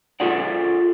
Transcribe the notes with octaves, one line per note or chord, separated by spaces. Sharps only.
F4 G#4 A4 D5 F#5